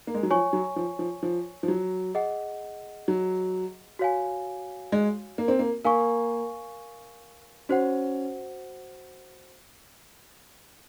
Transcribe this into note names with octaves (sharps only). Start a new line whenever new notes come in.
A#3
G#3
F#3
F3 C#5 G#5 C#6
F#3
F3
F3
F3
F3
F#3
G#4 D#5 F#5
F#3
F#4 C#5 F5 G#5
G#3
A#3
C4
A#3
A#3 A#4 F5 G#5 C#6
C#4 F#4 C5 F#5